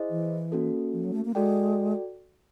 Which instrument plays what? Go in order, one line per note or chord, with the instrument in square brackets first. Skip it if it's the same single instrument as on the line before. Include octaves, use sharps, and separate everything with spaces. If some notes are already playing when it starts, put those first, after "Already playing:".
Already playing: [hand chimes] E4 G#4 C5 D#5
[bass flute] E3
[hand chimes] A#3 C#4 F#4 A4
[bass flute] F3
F#3
A3
A#3
[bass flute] G#3 [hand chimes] F#4 A4 D5 G5